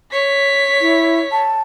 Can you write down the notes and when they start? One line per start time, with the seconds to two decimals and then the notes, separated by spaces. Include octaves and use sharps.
0.12 C#5 B6
0.81 E4
1.32 A5